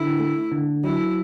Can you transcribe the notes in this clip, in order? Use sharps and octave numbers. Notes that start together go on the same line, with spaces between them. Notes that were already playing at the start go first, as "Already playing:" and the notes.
Already playing: D3 E4
A3
D3
F#3 E4